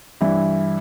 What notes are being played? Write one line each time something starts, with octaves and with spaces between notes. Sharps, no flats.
G2 E3 E4